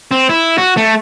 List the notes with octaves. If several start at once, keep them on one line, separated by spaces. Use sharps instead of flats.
C4
E4
F#4
A3